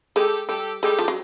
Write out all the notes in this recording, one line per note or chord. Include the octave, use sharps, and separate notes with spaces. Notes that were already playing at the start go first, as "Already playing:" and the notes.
G#3 G4 A4
G3 G4 A4
G#3 G4 A4
F3
F#3